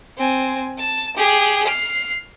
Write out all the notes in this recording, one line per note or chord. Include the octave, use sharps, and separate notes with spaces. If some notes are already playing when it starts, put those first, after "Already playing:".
C4 G#5
A5
G4 G#4
F6 C7